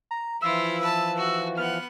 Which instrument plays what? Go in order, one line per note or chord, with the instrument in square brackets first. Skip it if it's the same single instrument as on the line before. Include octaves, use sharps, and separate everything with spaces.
[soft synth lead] A#5
[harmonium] E3 F3 [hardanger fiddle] E4 F4 [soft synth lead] E6
[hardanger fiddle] B4 A5
F#4
[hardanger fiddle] B3 F#5 [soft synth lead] F6